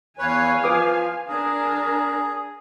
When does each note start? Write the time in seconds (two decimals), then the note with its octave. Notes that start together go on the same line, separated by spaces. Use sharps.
0.19 E2 B4 C#5 F5 G#5
0.64 F3 B4 D6 D#6
1.28 D4 G#4 A#4